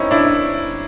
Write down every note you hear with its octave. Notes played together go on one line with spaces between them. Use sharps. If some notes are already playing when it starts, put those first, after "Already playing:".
Already playing: C4 C#4 D#4 E4
D4 E4